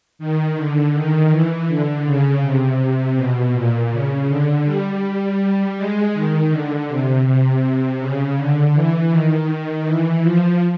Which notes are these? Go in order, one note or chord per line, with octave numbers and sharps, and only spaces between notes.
D#3
D3
D#3
E3
D3
C#3
C3
B2
A#2
C#3
D3
G3
G#3
D#3
D3
C3
C3
C#3
D3
E3
D#3
E3
F3